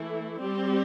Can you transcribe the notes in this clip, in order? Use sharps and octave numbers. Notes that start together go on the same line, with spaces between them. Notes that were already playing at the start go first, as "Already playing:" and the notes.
Already playing: E3 A3 E4
G3 C4 G4